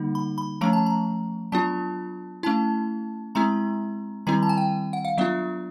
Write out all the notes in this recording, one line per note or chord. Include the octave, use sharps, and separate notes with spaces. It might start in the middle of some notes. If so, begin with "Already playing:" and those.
Already playing: D3 G3 A#3 D#4
B5
B5
F3 A3 C#4 A#5
A5
A#5
F#3 B3 D4 F4 A5
A3 C#4 E4 A5
G#3 C4 E4 A#5
D#3 G3 C4 E4 A#5
A5
G#5
G5
F#5
F5
F#3 B3 D4 F4 E5